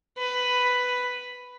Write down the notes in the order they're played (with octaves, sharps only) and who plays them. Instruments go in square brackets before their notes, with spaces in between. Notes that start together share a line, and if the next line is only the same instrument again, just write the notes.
[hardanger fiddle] B4